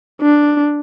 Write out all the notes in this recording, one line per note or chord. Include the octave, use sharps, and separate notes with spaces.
D4